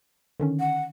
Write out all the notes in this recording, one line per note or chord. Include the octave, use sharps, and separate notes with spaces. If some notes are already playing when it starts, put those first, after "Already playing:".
D3 D#3 C#4
F#5